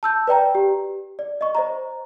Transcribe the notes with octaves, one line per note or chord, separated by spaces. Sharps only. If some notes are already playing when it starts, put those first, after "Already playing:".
A5 E6 G6
B4 D5 G5 A#5
G4
D5
D#5 C#6
C5 D#5 A#5